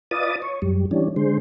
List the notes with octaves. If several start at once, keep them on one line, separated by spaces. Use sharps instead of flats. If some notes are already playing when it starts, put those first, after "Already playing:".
F4 B4 D5 D#5 A5 D#6
C#5
F#2 G3
E3 G3 C#4 D4
D3 G#3 C5